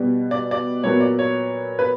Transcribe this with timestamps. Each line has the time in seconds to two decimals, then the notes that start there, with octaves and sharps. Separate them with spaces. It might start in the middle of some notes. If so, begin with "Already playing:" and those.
Already playing: B2 G3 B3
0.31 D5
0.51 D5
0.83 A#2 F#3 B3 C#5
1.00 D5
1.19 C#5
1.79 B4